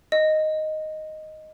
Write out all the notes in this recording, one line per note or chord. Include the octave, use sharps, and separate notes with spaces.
D#5